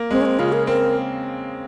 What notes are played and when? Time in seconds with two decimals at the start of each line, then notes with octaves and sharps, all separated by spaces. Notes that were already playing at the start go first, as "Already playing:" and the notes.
Already playing: A#3
0.10 G#3 C4
0.21 C#4
0.25 C4
0.39 C#3 F4
0.53 A#4
0.67 C4 A#4